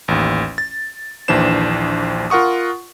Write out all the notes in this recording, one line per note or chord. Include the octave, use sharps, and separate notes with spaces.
A1 D#2
A6
A#1 D#2 E3 D4 C5 E7
F4 A#4 F#5 C#6 D#6